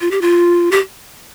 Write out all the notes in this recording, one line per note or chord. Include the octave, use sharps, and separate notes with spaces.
F4
G4
F4
G4